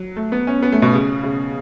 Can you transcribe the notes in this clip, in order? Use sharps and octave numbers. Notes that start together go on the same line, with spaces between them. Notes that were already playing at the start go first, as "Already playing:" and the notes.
Already playing: F#3
A3
B3
C#4
B3
A3
B2
C#3
C#3